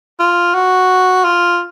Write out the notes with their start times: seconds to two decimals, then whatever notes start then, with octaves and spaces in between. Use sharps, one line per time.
0.19 F4
0.54 F#4
1.24 F4